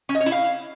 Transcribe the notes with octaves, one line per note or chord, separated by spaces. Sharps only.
C#4
D#5
C#5
E4
F5